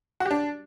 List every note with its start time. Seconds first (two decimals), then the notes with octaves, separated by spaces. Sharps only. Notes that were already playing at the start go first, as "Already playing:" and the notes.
0.20 F#4
0.25 G4
0.31 D4